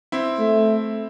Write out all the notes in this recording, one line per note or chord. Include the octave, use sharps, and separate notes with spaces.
C4 E4
A3